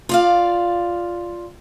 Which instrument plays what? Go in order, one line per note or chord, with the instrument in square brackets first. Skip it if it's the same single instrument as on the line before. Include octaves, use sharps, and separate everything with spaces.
[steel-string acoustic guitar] F4 D5 F5